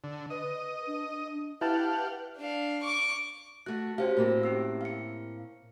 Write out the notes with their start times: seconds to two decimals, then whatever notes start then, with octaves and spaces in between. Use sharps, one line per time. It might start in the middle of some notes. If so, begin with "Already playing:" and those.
0.04 D3
0.30 B4 D#5
0.87 D4
1.61 E4 G4 B4 F5 F#5 A5
2.37 D4 F5
2.83 C#6 D6
3.66 A3 F#4 F#6
3.98 C#4 F#4 G4 C5 F5
4.17 A2 A#3 C4
4.43 C#4 G4 E6
4.81 F5 C#7